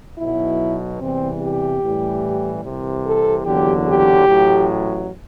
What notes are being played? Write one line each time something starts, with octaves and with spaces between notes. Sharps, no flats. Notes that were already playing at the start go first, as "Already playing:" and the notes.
B1 B2 F#3 E4
E2 C3 E3 G3 C4
G4
A1 A2 E3 G3
C2 C3 E3
A4
F#1 E2 D3 F#3 G4
G4
A1 A2 F#3